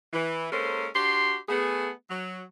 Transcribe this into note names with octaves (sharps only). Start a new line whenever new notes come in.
E3
G#3 A#3 C#4 A4 A#4 C5
D4 F#4 G4 C6
A3 B3 G#4
F#3